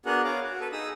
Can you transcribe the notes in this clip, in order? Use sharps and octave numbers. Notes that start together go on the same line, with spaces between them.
B3 D4 F#4 G#4 A#4 F#5
C#5 F5 A#5 D6
F#4
A4 B4
D#4 G#4 D#6 E6